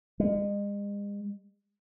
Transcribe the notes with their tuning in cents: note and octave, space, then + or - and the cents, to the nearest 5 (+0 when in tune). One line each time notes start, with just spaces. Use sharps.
G#3 -40